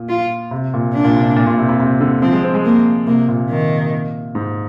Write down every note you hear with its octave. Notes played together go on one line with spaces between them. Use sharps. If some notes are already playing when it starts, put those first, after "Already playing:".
Already playing: A#2
F4
C3
A#2
D4
A#2
C3
A#2
A#2
C3
C3
C3
D3
F3 C4
G#3
C4
G#3
A#3
C3 A#3
A#2
D#3
G#2